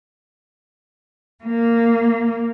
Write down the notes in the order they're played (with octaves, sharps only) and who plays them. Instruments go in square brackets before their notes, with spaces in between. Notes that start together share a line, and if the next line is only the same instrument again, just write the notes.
[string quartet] A#3